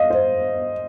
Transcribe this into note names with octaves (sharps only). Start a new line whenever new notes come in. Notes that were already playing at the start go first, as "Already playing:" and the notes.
Already playing: D#5 F5
C5